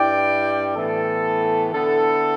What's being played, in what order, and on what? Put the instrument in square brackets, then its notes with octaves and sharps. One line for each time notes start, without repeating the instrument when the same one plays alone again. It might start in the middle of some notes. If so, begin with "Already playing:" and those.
Already playing: [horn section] G2 G3 E4 D5 G5
A2 E3 B3 A4
D3 B3 E4 A4